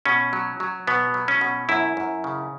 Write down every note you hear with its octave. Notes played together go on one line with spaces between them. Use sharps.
B2 C#4
F#3
F#3
B2 B3
F#3
C#4
B2
F#2 E4
F#2
C#3